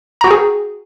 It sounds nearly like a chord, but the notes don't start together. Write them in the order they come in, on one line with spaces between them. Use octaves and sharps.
A#5 F#4 G5 G#4